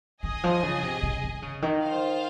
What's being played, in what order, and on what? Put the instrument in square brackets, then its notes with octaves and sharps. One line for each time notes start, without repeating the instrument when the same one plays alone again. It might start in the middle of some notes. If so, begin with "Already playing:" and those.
[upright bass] D#3 [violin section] G#4 D#5 G#5
[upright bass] F3
C#3
C3
C#3
D#3
C#3
D#3
[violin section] F4 C5 F5